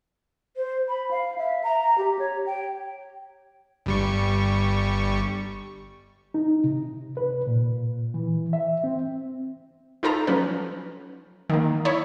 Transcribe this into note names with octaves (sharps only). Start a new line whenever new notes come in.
C5
B5
F5
E5
A#5
G4
C#5
G5
G1 G3 C#6
D#4
C3
B4
A#2
E3
E5
C4
D#4 F4 A4 A#5
F3 F#3 C#4 B4
D#3 A#3
D#4 E4 C#5